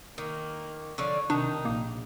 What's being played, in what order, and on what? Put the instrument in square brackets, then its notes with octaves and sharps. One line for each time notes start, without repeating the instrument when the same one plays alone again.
[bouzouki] D#3 [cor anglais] A#3
[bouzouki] D3 F3 D5 [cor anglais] C#5
[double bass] C3 [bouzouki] D#3 [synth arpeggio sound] D4 [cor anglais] D#4
[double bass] A#1 [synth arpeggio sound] A#3